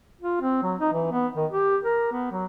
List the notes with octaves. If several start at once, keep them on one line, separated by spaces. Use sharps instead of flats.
F4
C4
F#3
D#4
E3
B3
D#3
G4
A#4
B3
F#3